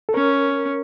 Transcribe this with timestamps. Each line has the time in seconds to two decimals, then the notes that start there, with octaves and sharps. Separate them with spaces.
0.09 A4
0.14 C#4 A#4